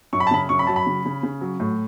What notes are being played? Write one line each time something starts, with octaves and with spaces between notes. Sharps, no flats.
F#2 C#6
B5
A5
C#3 B5
F#2 C#6
B5
F#3 A5
B5
C#3
C#3
C#3
F#3
A2